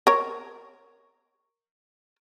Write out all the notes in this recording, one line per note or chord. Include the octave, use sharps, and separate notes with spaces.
A#4 C#5